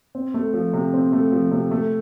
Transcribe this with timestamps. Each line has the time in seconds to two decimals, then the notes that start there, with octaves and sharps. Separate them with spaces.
0.15 C4
0.34 A3
0.54 F3
0.73 C3
0.93 C4
1.13 A3
1.32 F3
1.52 C3
1.71 A3